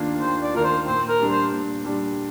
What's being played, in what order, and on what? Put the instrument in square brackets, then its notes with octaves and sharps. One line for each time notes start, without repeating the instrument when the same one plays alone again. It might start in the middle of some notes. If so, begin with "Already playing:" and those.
Already playing: [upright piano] D#2 D#3 A#3 D4 F4
[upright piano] D#2 [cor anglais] C5
[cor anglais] D5
[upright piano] D#3 A#3 D4 F4 [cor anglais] A#4
[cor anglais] C5
[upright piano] A#2 [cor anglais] C5
[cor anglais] A#4
[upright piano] G3 D4
[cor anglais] C5
[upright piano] A#2
G3 D4